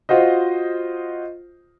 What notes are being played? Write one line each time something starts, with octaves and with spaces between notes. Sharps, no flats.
F4 F#4 C5 D#5